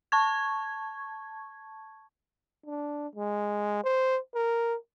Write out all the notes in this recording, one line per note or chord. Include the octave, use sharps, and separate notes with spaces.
A5 C#6 G#6
D4
G#3
C5
A#4